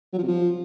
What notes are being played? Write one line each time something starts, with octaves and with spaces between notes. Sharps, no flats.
F#3
F3
C3
F3